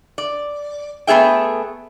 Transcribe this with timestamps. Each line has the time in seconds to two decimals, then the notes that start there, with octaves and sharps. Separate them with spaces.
0.18 D5
1.07 A3 B3 G#4 E5 G5